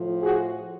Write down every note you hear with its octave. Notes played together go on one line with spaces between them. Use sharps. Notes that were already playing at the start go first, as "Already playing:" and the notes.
Already playing: A2 F3
F#4 G#4